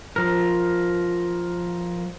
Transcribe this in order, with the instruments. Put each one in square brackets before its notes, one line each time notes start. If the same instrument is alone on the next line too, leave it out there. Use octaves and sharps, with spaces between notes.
[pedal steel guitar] F3 A#4